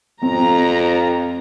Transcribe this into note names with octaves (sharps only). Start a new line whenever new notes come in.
F2 C4 A#5